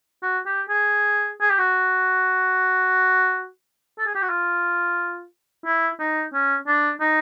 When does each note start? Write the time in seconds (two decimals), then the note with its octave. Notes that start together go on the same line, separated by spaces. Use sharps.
0.22 F#4
0.46 G4
0.69 G#4
1.41 G#4
1.50 G4
1.58 F#4
3.98 A4
4.06 G#4
4.15 G4
4.22 F#4
4.29 F4
5.65 E4
5.99 D#4
6.33 C#4
6.67 D4
7.00 D#4